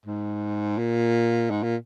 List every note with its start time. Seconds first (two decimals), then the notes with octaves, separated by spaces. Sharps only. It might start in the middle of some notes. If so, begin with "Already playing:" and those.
0.06 G#2
0.78 A#2
1.51 G#2
1.63 A#2